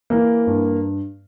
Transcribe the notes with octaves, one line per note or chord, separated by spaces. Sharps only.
E3 A#3
G2